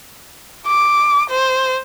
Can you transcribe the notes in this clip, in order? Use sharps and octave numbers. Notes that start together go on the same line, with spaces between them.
D6
C5